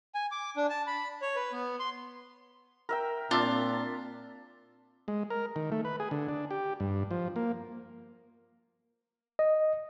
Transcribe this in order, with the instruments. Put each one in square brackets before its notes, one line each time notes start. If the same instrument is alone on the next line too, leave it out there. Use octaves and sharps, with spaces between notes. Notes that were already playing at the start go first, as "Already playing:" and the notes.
[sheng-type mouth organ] G#5
D6
D4
A5
B5
C#5
B4
B3
C6
[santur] A#4 E5 G5
[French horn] A#2 [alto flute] C4 [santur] D4 E5 [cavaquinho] F4
[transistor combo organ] G#3
A#4
D#3
A3
B4
G#4
D3
D4
G4
G2
F3
A#3
[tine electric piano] D#5